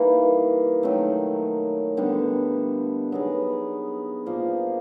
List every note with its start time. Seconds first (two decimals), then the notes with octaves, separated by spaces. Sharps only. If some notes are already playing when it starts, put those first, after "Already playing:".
Already playing: E3 G3 A#3 D#4
0.83 D#3 F#3 A3
1.97 D3 G3 B3 D4
3.12 F#3 B3 D#4 G#4
4.26 A#2 F3 A#3